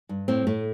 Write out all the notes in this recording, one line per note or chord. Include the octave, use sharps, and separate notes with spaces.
G2
A2 C4
A2 A3